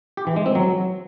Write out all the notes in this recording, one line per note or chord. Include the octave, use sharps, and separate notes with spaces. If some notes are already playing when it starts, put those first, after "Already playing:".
G4
E3
G#3
C4
F#3